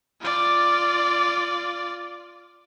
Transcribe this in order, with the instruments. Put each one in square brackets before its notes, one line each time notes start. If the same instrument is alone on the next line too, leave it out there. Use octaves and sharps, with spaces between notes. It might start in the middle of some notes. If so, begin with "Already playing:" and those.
[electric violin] F4 D5